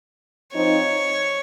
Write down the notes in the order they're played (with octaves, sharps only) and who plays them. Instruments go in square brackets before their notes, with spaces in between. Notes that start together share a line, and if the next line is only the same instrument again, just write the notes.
[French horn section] F3 C4 D#4 [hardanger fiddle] C#5